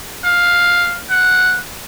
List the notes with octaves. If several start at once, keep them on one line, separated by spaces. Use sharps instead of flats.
F5
F#5